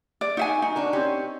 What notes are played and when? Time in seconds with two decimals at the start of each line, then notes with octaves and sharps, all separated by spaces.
0.21 D5
0.37 D#4 F#4 E5 G#5
0.62 D#4
0.75 D4 F#4 A#4
0.93 C4 C#4 G4